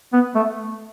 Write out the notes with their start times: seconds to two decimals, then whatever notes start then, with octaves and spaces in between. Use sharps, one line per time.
0.13 B3
0.35 A3